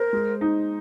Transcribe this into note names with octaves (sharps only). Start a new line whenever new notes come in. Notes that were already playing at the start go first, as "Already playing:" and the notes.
Already playing: A#4 C5
G#3
D#4